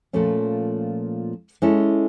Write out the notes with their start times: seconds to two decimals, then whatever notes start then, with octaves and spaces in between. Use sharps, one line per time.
0.13 A#2 F3 A3 C#4
1.62 G#3 C#4 E4 A4